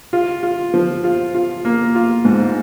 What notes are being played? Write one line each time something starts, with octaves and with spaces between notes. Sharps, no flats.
F4
F4
F3
F4
F4
A#3
F4
G#2